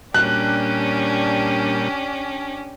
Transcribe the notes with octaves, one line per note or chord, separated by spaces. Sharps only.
A#2 G3 C#4 D4 G4 F#6